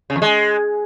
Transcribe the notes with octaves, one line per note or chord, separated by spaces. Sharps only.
C#3
E2
G#3